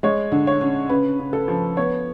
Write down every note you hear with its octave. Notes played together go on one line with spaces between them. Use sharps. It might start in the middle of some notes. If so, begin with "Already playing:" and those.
G#3 C#5
D3
C#5
C#4
C#3 B4
C#3
A4
F3
B3 C#5